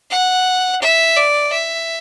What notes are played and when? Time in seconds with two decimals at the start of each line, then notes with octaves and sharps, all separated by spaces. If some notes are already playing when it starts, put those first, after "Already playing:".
0.11 F#5
0.81 E5
1.17 D5
1.52 E5